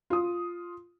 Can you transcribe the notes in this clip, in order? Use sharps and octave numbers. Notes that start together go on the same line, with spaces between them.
F4 D#6